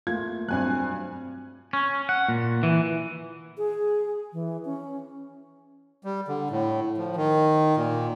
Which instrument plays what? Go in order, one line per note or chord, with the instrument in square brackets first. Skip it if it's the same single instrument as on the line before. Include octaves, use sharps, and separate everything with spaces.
[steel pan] A3 A#3 F4 [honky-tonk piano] G#6
[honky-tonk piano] G2 G#5 F#6 [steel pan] F#3 C4
[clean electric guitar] C#4
F#5
A#2
E3
[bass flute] G#4
E3
C#4
[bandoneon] G3
D3
A2
F3
D#3
A#2